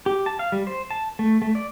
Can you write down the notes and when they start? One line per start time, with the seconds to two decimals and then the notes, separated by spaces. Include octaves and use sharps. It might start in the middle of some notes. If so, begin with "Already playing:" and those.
0.06 G4
0.26 A5
0.39 F5
0.52 G3
0.67 C5
0.90 A5
1.19 A3
1.42 A3
1.55 D5